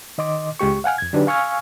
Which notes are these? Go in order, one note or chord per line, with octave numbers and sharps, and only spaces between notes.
D#3 D#5 C6 D6
C#2 G#3 G4 C#6
F5 F#5 G#5 F6
F2 G#6
D3 F#3 D4 D#4 G4 B4
F5 G#5 C#6 E6 F6 G#6